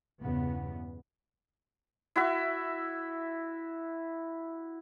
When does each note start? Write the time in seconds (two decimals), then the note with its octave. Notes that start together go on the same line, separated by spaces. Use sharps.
0.20 E2 G2 C#3 B3
2.16 E4 F#4 E5